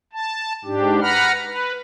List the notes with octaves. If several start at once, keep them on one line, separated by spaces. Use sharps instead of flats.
A5
G#2 D4 G4
B4 F#5 A#5 B5 F6
B4